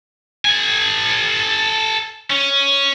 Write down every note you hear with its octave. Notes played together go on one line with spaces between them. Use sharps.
A4 G#5
C#4